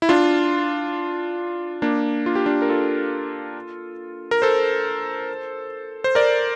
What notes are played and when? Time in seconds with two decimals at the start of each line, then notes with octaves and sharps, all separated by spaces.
0.02 E4
0.09 D4 F4
1.82 A#3 D4
2.26 F4
2.36 G4
2.46 D4 F4
2.62 A#4
2.69 F4 A4
4.31 A#4
4.42 A4 C5
6.04 C5
6.15 A#4 D5